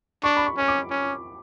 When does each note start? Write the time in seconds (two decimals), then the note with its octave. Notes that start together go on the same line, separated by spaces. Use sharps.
0.24 D4 C#6
0.37 B5
0.46 C#6
0.57 C#4 C#6
0.68 D6
0.91 C#4